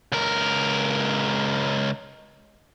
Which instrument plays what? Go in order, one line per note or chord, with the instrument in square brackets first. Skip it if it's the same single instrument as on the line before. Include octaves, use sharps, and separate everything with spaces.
[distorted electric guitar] C#2 A#4